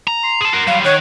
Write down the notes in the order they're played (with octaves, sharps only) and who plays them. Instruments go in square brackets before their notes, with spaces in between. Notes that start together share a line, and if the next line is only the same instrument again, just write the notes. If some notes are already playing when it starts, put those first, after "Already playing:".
[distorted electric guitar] A#5
[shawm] C6
[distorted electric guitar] G#4 A5
F#4 A#4
[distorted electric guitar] F#3 G3 [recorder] F5
[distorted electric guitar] D#3 [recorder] C#5 [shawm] F#5